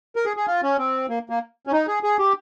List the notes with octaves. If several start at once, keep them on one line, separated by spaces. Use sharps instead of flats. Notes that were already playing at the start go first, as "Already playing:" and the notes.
A#4
G#4
G#4
F4
C#4
C4
A#3
A#3
C#4
D#4
G#4
G#4
G4